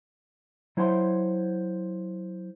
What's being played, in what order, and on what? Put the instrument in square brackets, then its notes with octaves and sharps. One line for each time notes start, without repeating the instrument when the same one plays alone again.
[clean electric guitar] F#3 E4 C5 F#5 A#5 C6